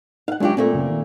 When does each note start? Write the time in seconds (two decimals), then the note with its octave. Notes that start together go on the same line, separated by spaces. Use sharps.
0.28 D#4 F5 F#5
0.40 F#2 F#3 G#3 D4 F4 G4
0.57 A#2 A3 A#3 C4
0.73 F#2 C#3
0.90 D#3